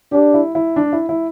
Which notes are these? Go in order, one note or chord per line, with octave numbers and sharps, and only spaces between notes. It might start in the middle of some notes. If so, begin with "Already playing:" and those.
D4 G4
E4
E4
D4
E4
E4